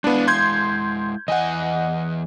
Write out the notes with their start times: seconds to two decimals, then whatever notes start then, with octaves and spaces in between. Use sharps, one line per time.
0.04 G#3 B3 D4 E4 F5
0.28 C6 G6 G#6
1.28 E2 E3 D#5 F#5 G#5